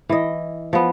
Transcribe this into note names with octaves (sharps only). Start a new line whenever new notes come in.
E3 D#5
F3 B3